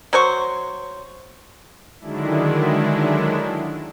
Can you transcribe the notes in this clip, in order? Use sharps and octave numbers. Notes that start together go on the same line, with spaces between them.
F#3 C5 C#6
D3 D#3 F#3 G#3 D4 E4